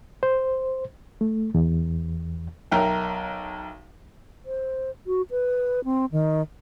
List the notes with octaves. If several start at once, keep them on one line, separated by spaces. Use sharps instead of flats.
C5
A3
E2
B1 A#4 E5 G5
C5
F#4
B4
C4
D#3